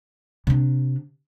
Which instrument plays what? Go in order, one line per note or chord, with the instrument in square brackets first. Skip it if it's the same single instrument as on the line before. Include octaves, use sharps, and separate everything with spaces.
[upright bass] C3 D4